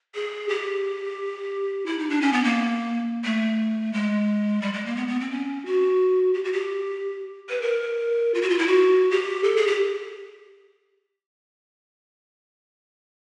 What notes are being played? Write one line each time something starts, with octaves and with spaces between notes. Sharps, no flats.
G#4
G4
E4
D#4
D4
C#4
B3
A#3
A3
G#3
G3
G#3
A#3
B3
B3
C4
C#4
F#4
G4
F#4
G4
B4
A#4
F4
F#4
F4
E4
F#4
G4
A4
G#4
G4